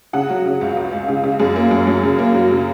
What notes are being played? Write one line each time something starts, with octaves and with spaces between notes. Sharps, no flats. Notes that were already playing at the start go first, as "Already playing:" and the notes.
C#3 F#5
F#3
C#3
C#2
C#2
C#2
C#3
C#3
F#2 G#4
A#3
F#2
F#2
C#3
A#3
F#3
C#3